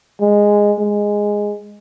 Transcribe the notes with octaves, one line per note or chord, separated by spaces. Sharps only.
G#3
G#3